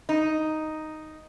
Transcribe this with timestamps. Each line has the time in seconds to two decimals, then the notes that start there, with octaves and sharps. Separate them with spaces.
0.09 D#4